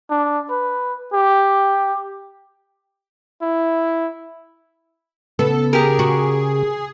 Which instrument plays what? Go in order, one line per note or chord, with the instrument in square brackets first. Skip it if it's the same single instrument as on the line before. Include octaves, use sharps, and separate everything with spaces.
[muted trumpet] D4
B4
G4
[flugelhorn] E4
[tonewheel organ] C#3 [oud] B3 [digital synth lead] A4
[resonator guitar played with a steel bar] G4 A#4 [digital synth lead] G#4
[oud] F#4